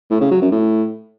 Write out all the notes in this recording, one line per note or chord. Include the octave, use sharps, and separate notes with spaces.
A2
C#3
F#3
F#2
A2